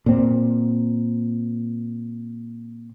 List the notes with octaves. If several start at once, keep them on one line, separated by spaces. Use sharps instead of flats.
A#2 C4